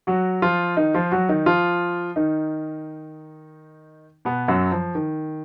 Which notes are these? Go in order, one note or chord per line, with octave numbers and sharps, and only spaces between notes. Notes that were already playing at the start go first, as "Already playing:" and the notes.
F#3 F#4
F3 F4
D#3 D#4
F3 F4
F#3 F#4
D#3 D#4
F3 F4
D#3 D#4
B2 B3
F#2 F#3
F3
D#3